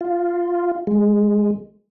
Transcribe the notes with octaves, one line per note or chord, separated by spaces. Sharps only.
F4
G#3